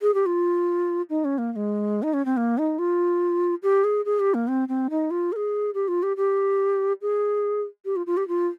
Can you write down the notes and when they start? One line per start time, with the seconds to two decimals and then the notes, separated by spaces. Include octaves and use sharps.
0.02 G#4
0.14 G4
0.26 F4
1.10 D#4
1.25 C#4
1.38 A#3
1.53 A#3
1.56 G#3
2.03 D#4
2.14 C#4
2.25 C4
2.37 A#3
2.58 D#4
2.79 F4
3.63 G4
3.84 G#4
4.05 G#4
4.20 G4
4.34 A#3
4.48 C4
4.68 C4
4.90 D#4
5.11 F4
5.32 A#4
5.36 G#4
5.74 G4
5.88 F4
6.03 G4
6.17 G4
7.02 G#4
7.85 G4
7.96 F4
8.07 F4
8.17 G4
8.28 F4